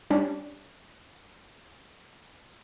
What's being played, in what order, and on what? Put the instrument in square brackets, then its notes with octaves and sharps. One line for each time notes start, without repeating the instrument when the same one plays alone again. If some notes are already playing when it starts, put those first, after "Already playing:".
[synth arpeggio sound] G3 C#4 D4